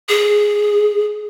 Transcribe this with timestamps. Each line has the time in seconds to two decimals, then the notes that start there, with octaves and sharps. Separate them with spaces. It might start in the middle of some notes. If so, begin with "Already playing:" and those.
0.09 G#4